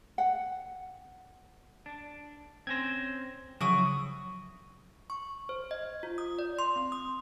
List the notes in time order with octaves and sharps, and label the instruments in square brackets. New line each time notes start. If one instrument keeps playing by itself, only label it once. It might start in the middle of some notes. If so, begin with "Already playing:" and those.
[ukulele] F#5
[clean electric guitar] D4
[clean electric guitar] C4 C#4 C5 [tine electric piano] G#6 A#6
[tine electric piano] C#3 F3 F#3 [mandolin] E4 C#6 D#6 [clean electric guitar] F#4
[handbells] C#6
C5
D#5
F4
D#6
D5
C6
C4
D#6